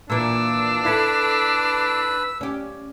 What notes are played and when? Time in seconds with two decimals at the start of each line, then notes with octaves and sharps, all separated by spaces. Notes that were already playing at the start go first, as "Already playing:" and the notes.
0.10 A#2 E3 D4 E6
0.85 E4 A4 B4
2.41 C#4 G4